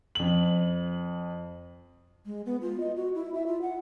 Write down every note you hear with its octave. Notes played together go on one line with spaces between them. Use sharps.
F2 F#7
G#3
B3
F4
D#5
F#4
E4
E5
F4
F#5